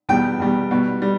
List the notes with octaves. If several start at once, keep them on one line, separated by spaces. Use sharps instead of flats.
E2 B2 G3 G5
E2 B2 G3
B2 G3
G3